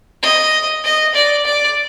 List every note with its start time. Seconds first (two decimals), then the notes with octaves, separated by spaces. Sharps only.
0.23 D#5
0.84 D#5
1.15 D5
1.45 D5